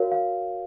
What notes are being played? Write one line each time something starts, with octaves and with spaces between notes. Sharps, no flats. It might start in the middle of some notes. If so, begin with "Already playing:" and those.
Already playing: F#4 A#4 C#5 F5
F5